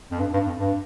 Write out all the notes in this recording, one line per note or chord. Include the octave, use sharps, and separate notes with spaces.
F2
G2
G2
F2
G2